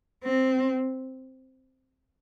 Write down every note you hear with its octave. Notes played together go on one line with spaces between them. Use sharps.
C4